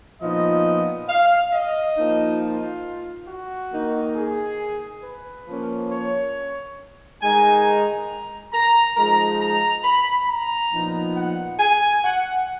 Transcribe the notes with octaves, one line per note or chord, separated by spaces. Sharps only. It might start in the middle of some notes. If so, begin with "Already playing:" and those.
A#2 F3 B3 D#4 D#5
F5
D#5
F3 A#3 D#4
F4
F#4
D#3 A#3 D#4
G#4
B4
F3 A#3 C#4
C#5
D#3 G#3 D#4 G#5
A#5
A#5
F3 G#3 D#4 A#5
A#5
B5
A#5
A#2 F3 B3 D#4
F#5
G#5
F#5